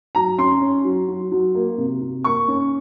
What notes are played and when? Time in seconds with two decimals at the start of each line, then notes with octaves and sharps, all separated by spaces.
0.15 F#3 A#5
0.38 C#4 C6
0.61 C#4
0.85 F#3
1.08 F#3
1.32 F#3
1.55 A#3
1.78 C3
2.01 C3
2.24 A#3 C#6
2.48 C#4